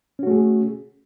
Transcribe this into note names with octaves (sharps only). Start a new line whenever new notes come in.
A3 C#4 F#4 G#4